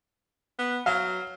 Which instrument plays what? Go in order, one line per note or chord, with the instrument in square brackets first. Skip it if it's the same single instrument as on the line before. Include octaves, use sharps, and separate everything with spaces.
[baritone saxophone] B3
[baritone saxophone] F#3 [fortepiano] F5